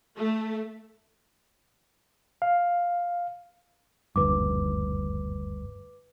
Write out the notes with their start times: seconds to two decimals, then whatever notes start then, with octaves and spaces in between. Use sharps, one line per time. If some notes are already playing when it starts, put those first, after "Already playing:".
0.16 A3
2.42 F5
4.16 F#1 D2 G2 B4 D6